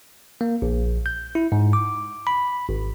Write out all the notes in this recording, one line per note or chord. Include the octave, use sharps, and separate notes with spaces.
A#3
A#1
G6
E4
G#2
D6
B5
G#1